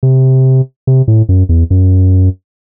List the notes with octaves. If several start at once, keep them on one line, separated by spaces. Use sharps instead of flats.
C3
C3
A2
F#2
E2
F#2